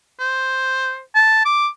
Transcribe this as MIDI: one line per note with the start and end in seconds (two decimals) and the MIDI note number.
0.20 1.00 72
1.15 1.42 81
1.45 1.67 86